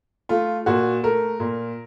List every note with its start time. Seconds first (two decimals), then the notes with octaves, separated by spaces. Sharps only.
0.29 A3 F4
0.66 A#2 F#4
1.03 A3 A#4
1.40 A#2